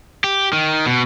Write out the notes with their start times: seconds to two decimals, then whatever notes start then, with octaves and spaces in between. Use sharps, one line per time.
0.24 G4
0.53 D#3
0.86 B2